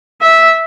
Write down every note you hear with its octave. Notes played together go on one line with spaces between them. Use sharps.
E5